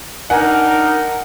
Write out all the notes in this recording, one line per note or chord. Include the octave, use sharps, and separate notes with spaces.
D4 D#4 A#4 F#5 G#5